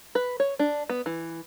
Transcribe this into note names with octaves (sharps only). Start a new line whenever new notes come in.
B4
C#5
D4
B3
E3